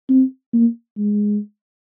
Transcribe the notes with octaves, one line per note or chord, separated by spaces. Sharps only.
C4
A#3
G#3